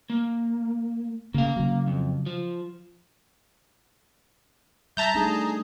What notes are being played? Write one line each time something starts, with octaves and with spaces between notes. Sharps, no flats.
A#3
C#3 A#3 F5
C#3 F#3
F2
F3
G3 E5 A5 A#5 G6
A3 D4 D#4 G#4